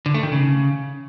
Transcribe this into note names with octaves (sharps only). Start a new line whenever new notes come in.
D3
A3
D#3
C#3